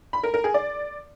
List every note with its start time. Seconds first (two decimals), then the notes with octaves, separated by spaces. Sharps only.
0.13 B5
0.23 A#4
0.34 A#4
0.44 G#4
0.54 D5